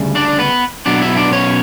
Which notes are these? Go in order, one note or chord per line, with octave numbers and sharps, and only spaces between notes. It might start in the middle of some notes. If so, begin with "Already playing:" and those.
Already playing: D2 C#3 G3
D4 D5
B3 B4
B2 F#3 B3 D4 D5
E4 E5
D4 D5
C#4 C#5